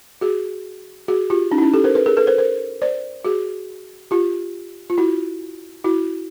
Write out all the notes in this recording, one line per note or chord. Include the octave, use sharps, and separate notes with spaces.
F#4 G#4
F#4 G#4
F4 G4
C#4 D#4
E4
C#4 D#4
G4 A4
A#4 C5
A4 B4
G#4 A#4
A4 B4
A#4 C5
A#4 C5
C5 D5
F#4 G#4
F4 G4
F4
E4 F#4
E4 F#4